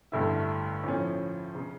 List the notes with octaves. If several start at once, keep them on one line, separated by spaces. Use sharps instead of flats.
A1 G2 D3 A3 E4
A2 F3 C#4
C#3